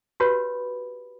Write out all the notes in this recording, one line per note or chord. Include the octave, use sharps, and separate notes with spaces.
F#4 G4 B4 C#5 B5